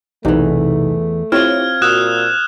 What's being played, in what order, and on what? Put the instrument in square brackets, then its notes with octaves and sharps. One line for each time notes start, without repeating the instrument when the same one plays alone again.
[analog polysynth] B1 C3 D#4 [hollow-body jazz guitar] E2 E3 [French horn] A3
[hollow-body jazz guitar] C4 F4 [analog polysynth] E4 G4 C#5 [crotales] F6 G#6
[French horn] A#2 [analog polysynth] F#4 E6 [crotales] D#6 F#6 E7